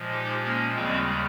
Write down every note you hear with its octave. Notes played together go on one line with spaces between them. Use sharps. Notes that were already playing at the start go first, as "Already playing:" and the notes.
Already playing: A#2 F3 G#3
D#4 G4
A#3 C#4
D#2 C#3 G3 G#3 C4